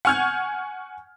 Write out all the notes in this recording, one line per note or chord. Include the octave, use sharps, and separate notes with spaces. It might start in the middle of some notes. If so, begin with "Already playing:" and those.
F#5 G#5 C#6 F6 G6 G#6